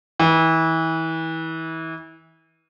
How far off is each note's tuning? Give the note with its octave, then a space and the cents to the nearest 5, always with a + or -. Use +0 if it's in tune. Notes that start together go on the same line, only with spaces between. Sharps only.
E3 -30